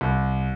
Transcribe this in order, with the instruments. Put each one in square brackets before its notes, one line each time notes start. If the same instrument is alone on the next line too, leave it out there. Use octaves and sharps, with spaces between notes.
[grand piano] C2